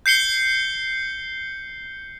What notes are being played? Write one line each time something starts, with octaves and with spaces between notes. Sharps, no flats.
G6 C7 C#7 G7